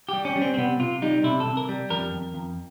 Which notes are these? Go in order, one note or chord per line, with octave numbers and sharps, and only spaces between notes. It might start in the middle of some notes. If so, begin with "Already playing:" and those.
G3 G4
C#4
G3
C4
C4
C3 B3
C3 F4
G3 D#4
C3 E4
A4
C3
A#4
G3
F2 A#4
F2
F2